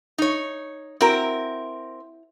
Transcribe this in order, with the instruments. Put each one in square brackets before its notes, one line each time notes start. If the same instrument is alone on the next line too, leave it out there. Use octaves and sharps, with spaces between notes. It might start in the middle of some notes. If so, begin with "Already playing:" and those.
[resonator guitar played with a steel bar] D#4 C#5
[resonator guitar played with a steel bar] C4 A#4 [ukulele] E4 F#4 A#5